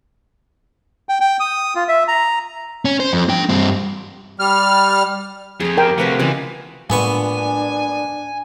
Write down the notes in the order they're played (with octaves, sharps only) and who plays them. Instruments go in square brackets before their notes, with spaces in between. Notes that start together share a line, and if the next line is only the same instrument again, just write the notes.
[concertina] G5
G5
D#6
F4
E5
A#5
[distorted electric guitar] C#4
C5
F2
D4 G5
G2 C4
[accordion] G3 F6
[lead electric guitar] F2 [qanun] G#4 A#5
[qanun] G4 [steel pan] A#4 G5
[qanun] C3 B4 F5 [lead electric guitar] A3 F#4
[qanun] C#3 F3 G#3 [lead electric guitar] E3
[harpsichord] A#1 B3 C#6 [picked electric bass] A2 G3 G#3 [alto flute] D4 [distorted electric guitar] G#5